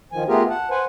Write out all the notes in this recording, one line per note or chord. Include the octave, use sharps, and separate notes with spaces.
D#3 F3 G#5
A3 B3 F4 G4 G#4 A#4
F#5 A5
B4 C5 F#5 G#5